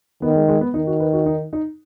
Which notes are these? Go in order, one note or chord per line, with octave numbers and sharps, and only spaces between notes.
D#3 B3
G#3
G#3
B3
D#3 D#4
F#4
B4
F#4
D#4
D#4